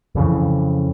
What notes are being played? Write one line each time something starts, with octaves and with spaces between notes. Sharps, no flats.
F2 C#3 E3